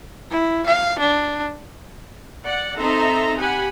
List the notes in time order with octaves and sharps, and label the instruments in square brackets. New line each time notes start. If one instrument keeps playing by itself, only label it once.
[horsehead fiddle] E4
F5
D4
[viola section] D5 F#5
C4 D#4 A4 E5 A#5 C6
G4 F#5 G#5 B5